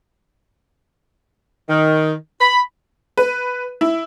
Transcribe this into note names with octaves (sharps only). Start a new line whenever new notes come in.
D#3
B5
B4
E4